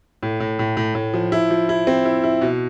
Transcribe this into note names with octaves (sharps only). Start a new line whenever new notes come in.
A2
A2
A2
A2
A2
F3
E4
F3
E4
C4
E4
E4
B2